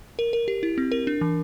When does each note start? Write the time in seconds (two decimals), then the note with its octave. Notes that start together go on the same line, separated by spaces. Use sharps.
0.19 A#4
0.33 A#4
0.48 G4
0.63 E4
0.78 C4
0.92 A#4
1.07 D4
1.21 E3